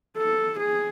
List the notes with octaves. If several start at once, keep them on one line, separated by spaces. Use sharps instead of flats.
A4
G#4